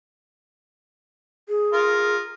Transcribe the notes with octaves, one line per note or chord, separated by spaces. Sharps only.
G#4
F4 A#4